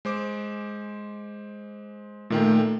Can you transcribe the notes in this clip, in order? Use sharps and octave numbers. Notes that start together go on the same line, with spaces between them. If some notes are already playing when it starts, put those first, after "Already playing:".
G#3 C5 D6
A#2 D#3 A3 G5